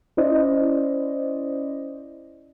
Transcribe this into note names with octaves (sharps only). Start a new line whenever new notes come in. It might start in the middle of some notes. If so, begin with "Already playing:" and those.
C#4 E4 C5 D5 D#5